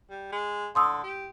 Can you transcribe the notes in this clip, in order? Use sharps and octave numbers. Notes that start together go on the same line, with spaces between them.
G3
G#3
D3 C6 D#6 E6
G4